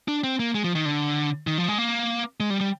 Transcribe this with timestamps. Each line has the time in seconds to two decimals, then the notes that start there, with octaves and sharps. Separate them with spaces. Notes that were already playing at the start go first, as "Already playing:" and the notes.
0.08 D4
0.24 C4
0.39 A#3
0.54 G#3
0.64 F3
0.75 D#3
0.86 D3
1.47 D#3
1.58 F3
1.68 G#3
1.78 A#3
2.40 G#3
2.50 G3
2.61 G3